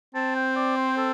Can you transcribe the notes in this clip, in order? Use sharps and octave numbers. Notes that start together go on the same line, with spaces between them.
C4 A5
G5
D5
C5
A4